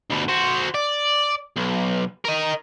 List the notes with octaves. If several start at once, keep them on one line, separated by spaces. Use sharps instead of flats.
D2 B2
F#4 C5
D5
B1
A#4 D#5